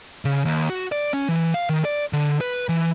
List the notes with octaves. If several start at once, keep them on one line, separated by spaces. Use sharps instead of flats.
C#3
D#2
F#4
D5
C#4
E3
F5
D#3
D5
D3
B4
E3